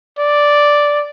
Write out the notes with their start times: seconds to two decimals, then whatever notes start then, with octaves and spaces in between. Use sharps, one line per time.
0.18 D5